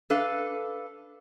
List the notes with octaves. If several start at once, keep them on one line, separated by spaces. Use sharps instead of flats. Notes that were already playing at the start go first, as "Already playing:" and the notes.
D4 A4 B4 F5